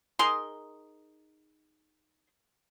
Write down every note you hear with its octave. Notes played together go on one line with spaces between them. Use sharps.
D#4 G#4 A#4 C6